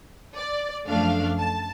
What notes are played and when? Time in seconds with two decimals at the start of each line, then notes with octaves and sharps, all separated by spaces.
0.36 D5
0.87 F#2 F3 A3 D4 F5
1.37 A5